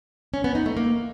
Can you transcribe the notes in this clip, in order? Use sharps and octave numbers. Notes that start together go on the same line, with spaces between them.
C#4
B3
D#4
A3
A#3